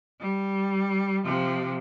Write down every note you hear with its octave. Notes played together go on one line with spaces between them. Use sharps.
G3
C3 F3